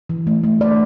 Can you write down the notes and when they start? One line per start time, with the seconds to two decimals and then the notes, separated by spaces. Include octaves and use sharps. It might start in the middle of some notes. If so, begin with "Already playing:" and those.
0.10 E3
0.27 A3
0.44 A3
0.60 E3 D5